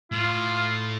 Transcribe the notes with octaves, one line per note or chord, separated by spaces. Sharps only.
A2 F4